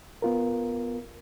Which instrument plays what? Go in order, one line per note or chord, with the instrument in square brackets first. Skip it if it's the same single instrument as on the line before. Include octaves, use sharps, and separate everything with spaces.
[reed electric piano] B3 F4 A#4